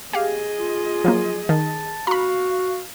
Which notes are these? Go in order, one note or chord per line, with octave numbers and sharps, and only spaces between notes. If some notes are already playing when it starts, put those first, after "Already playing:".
G4 G#4 D#5 F5
F4
F3 F#3 A#3
D#3 A5
F#4 F5 A#5 B5